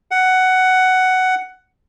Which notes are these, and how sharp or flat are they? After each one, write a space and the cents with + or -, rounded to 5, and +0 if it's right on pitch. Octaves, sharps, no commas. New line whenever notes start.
F#5 +10